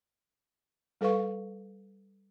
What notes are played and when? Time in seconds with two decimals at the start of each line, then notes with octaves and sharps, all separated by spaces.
1.01 G3 A4 B4 F5 C#6